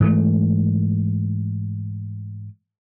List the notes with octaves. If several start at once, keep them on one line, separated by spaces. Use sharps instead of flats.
G#2 E3 A3